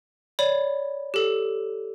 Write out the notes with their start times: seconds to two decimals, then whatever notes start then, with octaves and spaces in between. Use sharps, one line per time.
0.39 C#5 D5 B5
1.14 G4 A4